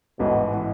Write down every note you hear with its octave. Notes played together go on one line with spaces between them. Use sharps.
A1 G#2 B2 E3
E3